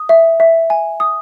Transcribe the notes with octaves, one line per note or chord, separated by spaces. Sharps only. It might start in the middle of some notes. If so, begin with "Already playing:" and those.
Already playing: D#6
E5
E5
G#5
D#6